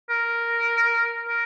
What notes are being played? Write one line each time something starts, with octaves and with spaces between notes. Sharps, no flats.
A#4
A#4